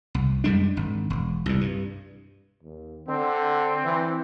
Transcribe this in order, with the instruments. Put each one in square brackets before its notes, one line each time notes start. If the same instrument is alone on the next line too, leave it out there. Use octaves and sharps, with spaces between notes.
[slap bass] C2
F#2 G3 G#3 D4
G#1
E1
C2 A#2
G2
[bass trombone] D#2
[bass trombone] D3 [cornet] C4
[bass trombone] E3